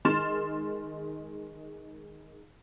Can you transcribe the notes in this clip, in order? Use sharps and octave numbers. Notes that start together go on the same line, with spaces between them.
D#3 G#3 C6 F6 A6 E7